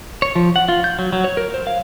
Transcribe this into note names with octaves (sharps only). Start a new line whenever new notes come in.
C#5
F3
F#5
F4
G6
F#3
F#3
C#5
A#4
C5
F5